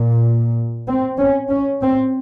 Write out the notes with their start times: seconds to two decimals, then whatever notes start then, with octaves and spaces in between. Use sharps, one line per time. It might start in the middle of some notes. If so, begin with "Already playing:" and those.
Already playing: A#2
0.88 C4
1.19 C#4
1.50 C#4
1.82 C4